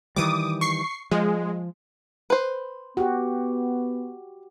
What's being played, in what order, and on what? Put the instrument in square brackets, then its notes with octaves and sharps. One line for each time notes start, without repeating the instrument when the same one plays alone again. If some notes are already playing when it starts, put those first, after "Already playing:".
[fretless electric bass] D#3 E3 G3 [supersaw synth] D6 D#6
[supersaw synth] C#6 C7
[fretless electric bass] F3 [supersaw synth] G#3
[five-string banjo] B4 C5
[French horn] B3 [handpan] F#4 G4